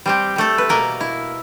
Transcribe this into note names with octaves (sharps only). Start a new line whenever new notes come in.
G3 C4 G4
G3 A3 A4
B4
B2 A#3 A#4
E4